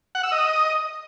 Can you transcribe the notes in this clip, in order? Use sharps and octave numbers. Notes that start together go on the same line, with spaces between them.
F#5
E6
D#5